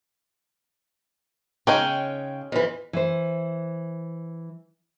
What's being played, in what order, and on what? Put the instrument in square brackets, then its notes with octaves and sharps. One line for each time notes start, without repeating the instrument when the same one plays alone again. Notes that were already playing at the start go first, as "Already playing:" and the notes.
[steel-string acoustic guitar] C#3 G5 [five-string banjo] G#3 C#4 D#4
[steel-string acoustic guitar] F2 E3
[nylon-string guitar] E3 C5